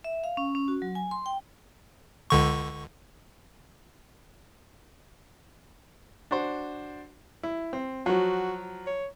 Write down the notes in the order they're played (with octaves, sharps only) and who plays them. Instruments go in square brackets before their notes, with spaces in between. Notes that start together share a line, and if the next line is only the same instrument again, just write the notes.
[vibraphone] E5
F5
C#4
C#4
F#4
F#3
G#5
C6
G5
[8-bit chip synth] C#2 D3 C#6
[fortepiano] D4 F#4 C5
E4
C4
[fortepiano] F3 F#3 [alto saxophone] F#4
[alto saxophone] C#5